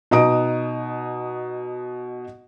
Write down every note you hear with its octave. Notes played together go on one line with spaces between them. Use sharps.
B2 D#4 A#5 D#6 D7